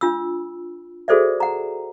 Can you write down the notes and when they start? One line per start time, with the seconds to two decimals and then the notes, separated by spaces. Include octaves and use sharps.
0.01 D4 F4 B5 E6
1.08 F#4 G#4 A4 C5 D5 E5
1.40 F#5 A#5